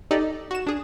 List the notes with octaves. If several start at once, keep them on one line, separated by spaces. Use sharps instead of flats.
D#4 G4 A4 D5 D#5
F#4 E7
D4 G#4